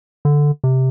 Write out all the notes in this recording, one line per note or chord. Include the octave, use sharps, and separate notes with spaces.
D3
C3